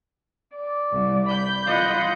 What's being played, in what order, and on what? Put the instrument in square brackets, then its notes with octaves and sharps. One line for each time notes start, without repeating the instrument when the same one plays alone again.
[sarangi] D5
[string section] C2
B5 G6
[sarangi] F4 [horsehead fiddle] D#5 F#5